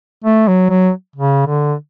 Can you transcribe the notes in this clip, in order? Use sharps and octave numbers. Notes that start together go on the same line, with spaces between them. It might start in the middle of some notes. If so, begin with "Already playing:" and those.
A3
F#3
F#3
C#3
D3